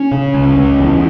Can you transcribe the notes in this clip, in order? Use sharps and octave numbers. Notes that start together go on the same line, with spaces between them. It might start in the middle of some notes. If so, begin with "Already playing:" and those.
Already playing: C#4
C#3
C#2
C#2
E2